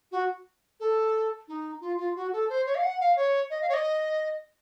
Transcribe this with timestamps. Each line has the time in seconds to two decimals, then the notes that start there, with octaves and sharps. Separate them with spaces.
0.12 F#4
0.80 A4
1.48 D#4
1.81 F4
1.98 F4
2.16 F#4
2.33 A4
2.49 C5
2.66 C#5
2.75 F5
2.83 F#5
3.00 F5
3.16 C#5
3.50 D#5
3.62 F5
3.69 C#5
3.74 D#5